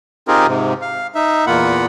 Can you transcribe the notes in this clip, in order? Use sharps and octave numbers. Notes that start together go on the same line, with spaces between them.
C4 D#4 F4 G4 G#4 A#4
G#2 C3
F5
D#4 E5
E2 A#2 A#3 F4 F#5 B5